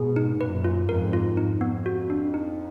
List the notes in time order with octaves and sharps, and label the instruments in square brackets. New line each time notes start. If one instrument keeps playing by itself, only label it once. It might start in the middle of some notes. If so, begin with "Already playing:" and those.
Already playing: [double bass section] G#2 B2 [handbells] G#4
[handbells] D#4
[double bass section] F#2 A#2 [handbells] B4
[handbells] F4
[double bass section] F2 G#2 [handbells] A#4
[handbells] F4
[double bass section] F2 [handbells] D#4
[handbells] B3
F#4
D4
D#4